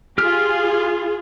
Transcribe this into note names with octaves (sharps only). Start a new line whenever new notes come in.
F4 G4 G#4 F6